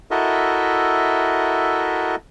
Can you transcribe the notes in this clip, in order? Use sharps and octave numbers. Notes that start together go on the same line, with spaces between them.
E4 F#4 A4 A#4 D#5 E5